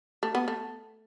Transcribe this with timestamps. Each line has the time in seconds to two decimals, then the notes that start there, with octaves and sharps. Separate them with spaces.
0.23 A3
0.35 B3
0.48 A3